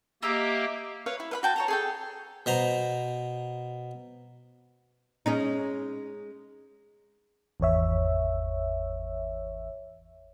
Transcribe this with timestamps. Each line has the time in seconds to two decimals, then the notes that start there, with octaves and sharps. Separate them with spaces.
0.23 A#3 G4 D#5 E5 A#5
1.06 B4 C#5 F5
1.20 E4
1.31 B4 F5 B5
1.43 F#4 G5 A5
1.56 C#5 A5 A#5
1.68 G#4 A4 G5
2.46 B2 C5 A#5
5.26 G#3 C#4 D#4
7.60 G#1 E2 C#5 E5